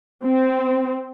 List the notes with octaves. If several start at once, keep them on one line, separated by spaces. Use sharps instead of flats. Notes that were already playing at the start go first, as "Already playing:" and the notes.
C4